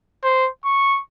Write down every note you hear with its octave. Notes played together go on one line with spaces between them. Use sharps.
C5
C#6